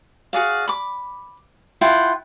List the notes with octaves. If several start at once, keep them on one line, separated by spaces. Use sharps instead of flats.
F#4 G#4 D5 F5
B5 D6
E4 F4 F#5 G5